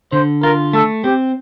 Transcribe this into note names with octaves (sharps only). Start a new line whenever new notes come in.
D3 C5
F4 A#4
A3 A4
C4 G4